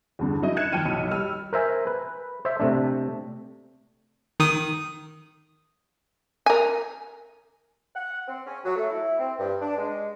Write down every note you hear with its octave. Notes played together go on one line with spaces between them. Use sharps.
E2 G2 D3
F#3 D#4 E4 D#5
F#6 G#6 C#7 E7
F2 D#3 G5 A5 F6 D#7
B1
G3 E6 F6
A#4 C5 E5 G#5
B4
C5 E5
C3 A3 D4
D#3 D#6
A#4 G#5
F#5
C4
C#4
F#3
A3
E4
C4
G2
D4
G#3